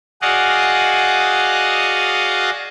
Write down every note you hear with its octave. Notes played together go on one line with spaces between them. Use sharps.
F#4 G#4 D5 D#5 F5 F#5